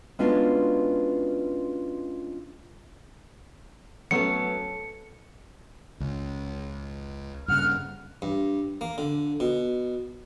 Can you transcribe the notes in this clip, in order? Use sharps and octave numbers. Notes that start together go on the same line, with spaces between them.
G#3 B3 C#4 D4 F4 F#4
F#3 A3 B3 C#4 A4 C#7
C#2
G2 C#3 F#5 F6
G2
A#3
D3
B2